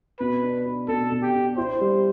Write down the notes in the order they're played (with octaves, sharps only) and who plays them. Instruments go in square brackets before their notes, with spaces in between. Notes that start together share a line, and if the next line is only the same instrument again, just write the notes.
[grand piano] B2 [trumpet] B4
[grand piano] D4
D4
[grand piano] B2 [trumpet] A4
[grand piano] B2
[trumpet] G4
[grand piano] D4
[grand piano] E4 [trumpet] C5
[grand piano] G3